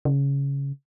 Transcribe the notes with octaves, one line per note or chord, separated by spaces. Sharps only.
C#3